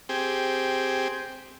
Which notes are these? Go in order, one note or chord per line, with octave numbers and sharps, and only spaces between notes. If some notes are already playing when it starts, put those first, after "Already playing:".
C4 G4 G#4